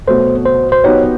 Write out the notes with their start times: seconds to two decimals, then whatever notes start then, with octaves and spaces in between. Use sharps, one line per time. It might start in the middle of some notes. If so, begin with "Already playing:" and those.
0.07 B2 F#3 A3 C5
0.46 C5
0.72 C5
0.84 F#3 B3 D#4 G4 C5 C#5